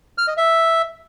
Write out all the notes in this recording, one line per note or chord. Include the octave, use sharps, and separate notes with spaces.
F6
D#5
E5